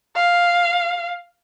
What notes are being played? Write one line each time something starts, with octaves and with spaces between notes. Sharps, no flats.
F5